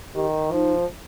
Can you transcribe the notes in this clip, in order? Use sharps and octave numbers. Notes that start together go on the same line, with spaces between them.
D#3 G4
F3 D#4